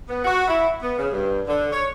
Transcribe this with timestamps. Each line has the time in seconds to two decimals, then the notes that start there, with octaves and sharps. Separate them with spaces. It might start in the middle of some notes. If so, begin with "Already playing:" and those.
0.09 B3
0.25 F#4
0.48 E4
0.83 B3
0.99 C#3
1.12 G2
1.47 D3
1.72 C#5